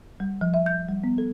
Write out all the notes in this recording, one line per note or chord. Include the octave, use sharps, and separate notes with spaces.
G3
F3
E5
G6
G3
B3
A4